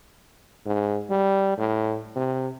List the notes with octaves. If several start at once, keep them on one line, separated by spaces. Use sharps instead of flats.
G#2
G3
A2
C3